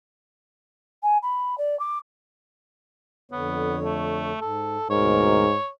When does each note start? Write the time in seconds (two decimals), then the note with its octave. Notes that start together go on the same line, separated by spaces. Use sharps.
1.03 G#5
1.22 B5
1.58 D5
1.79 D6
3.32 F2 D3 B3 C#5
3.84 A3
4.41 G#2 A4
4.90 D2 G#2 B2 A#4 C#5